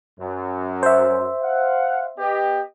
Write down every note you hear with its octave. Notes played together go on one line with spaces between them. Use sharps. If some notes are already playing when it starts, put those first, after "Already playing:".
F#2
C5 E5
F5 F#5
B3 G4 D#5